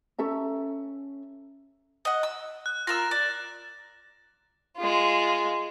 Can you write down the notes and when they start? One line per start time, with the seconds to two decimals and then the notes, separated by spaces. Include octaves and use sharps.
0.18 C#4 A4 E5 A#5
2.05 D#5 F#5
2.23 E6
2.66 F#6
2.87 F4 A#4 E6 A#6 E7
3.11 D5
4.76 G#3 F4